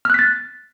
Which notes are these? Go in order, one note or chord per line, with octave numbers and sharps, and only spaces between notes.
F6 F#6 A6 B6